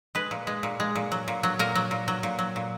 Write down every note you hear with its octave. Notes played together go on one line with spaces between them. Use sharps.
G#3 B4
A#2
G#3
A#2
G#3
A#2
F#3
A#2
F#3
A#2 A#4
F#3
A#2
F#3
A#2
F#3
A#2